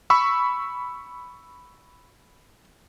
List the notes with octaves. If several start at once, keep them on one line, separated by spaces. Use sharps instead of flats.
B5 C#6 E6